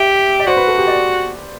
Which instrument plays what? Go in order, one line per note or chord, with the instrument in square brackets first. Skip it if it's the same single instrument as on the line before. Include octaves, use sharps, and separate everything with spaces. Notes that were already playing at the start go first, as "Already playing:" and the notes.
Already playing: [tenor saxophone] G4 [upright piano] E5
[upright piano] D5
[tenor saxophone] F#4 [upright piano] C5
[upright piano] B4
A4
G4
D5